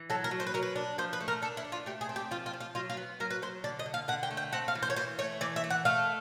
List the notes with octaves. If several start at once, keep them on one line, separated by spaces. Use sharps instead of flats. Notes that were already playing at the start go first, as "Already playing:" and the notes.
Already playing: E3
F#3 A4
A#4
F#3
C5
B4
F#3 A#4
B4
D4
F3 C5
B4
A3
A#4
D4 A4
E4
D4
F4
A3 G4
G#4
C4
G4
F3 F4
F4
F3
F4
F#3 F4
F4
B3
F#3 A#4
B4
F#3 C5
D3 D5
D#5
D3
F5
D3 F#5
G5
A3
G5
C4 F#5
F5
E3
C5
C#5
E3 C5
A3 C#5
E3 D5
E5
A3
F#5
A3 F5